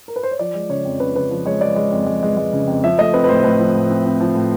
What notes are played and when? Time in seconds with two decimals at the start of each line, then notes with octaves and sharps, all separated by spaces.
0.08 A#4
0.16 B4
0.23 C5
0.31 C#5
0.39 F3 D5
0.54 G#3
0.69 C#3 C#5
0.85 F2
1.00 C#3 B4
1.15 C#3 B4
1.31 F3
1.45 G#3 C#5
1.61 G#3 D5
1.76 G#3
1.92 F2
2.06 G#3
2.23 G#3
2.37 G#3
2.53 C#3
2.67 F2
2.84 F3 E5
2.98 A3 D#5
3.13 C4 B4
3.24 B4
3.29 A2 C5
3.44 A2 B4
3.59 F3
3.75 A2
3.90 C4
4.06 C4
4.21 F3
4.35 A2